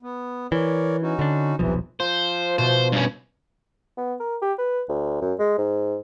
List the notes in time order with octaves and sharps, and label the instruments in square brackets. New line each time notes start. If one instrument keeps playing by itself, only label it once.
[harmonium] B3
[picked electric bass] E3 [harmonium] A#4 C#5 D5
[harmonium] C#4 D#4 F#4
[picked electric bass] D3 D4
[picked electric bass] D#1 B1 F3 [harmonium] C3 E3
[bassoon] F3 [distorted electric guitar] C5
[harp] B2 [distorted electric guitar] C5
[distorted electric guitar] G2 C#4
[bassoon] B3
A#4
G4
B4
D2
F#2
G#3
G#2